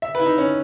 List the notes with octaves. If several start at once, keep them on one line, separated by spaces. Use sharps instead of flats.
E5
B4
E4
D#4
C#4